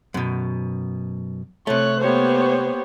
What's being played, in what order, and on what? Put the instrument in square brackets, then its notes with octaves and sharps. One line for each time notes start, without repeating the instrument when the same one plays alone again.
[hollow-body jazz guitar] F#2 B2
[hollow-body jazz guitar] C3 A3 [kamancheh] C#5 F#6
[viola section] A#3 B3 C#5 [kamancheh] G4 C5